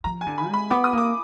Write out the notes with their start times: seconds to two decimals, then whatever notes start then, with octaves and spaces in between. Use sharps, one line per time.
0.04 F3 A#5
0.21 G#5
0.27 D3
0.38 B5
0.48 G#3 B5
0.70 B3 D6
0.84 D#6
0.93 A#3 D6